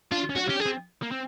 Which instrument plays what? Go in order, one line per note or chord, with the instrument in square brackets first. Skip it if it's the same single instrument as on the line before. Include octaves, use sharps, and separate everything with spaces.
[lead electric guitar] D4 [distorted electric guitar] F4
[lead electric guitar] C#4
[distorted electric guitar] F#4
[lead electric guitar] C#4 [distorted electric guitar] G4
[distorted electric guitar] G#4
[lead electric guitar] C4
A#3
C4